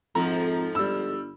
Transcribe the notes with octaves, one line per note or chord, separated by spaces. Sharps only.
F2 G#2 F3 A4 A#5
G1 G3 E6